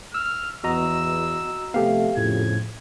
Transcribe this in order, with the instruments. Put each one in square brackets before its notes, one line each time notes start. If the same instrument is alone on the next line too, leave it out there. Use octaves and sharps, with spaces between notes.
[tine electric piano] E6 [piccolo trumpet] F6
[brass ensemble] E2 B3 [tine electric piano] F#4 D#5 A#5 [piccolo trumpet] E6
[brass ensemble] C3 F3 A3 [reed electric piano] B3 G4 A4 [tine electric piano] F5
[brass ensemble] F2 C#3 F3 [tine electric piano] A2 [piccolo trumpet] G#6